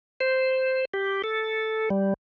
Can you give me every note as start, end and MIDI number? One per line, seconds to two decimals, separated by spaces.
0.21 0.85 72
0.94 1.22 67
1.24 1.89 69
1.90 2.14 55